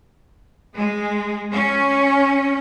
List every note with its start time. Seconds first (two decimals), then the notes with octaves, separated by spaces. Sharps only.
0.77 G#3
1.54 C#4